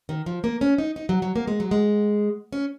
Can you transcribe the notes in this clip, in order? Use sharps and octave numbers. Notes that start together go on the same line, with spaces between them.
D#3
F3
A#3
C#4
D#4
D#4
F#3
F#3
A#3
G#3
F#3
G#3
C#4